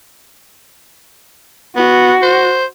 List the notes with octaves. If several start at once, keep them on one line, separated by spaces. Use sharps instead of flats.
B3 F#4
C5